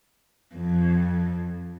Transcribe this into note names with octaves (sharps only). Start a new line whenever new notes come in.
F2